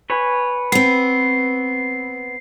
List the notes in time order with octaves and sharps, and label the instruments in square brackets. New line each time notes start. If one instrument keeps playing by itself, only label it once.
[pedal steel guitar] B4 C#5 G#5
[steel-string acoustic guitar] B3 C4 [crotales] C7